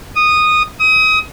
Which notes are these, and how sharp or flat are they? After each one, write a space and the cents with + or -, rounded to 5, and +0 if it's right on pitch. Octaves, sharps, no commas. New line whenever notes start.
D#6 -10
D#6 +30